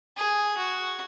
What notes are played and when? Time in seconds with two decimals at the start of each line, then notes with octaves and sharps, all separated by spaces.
0.17 G#4
0.58 F#4